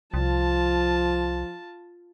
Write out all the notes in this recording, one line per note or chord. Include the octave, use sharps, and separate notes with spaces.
C2 F3 F4 A5